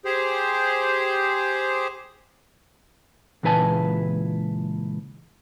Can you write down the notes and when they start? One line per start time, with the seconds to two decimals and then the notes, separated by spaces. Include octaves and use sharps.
0.05 G4 G#4 C5
3.43 C#2 A#2 E3 B4 G#5 A5